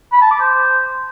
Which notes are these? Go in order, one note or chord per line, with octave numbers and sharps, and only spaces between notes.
B5
A5
D6
C5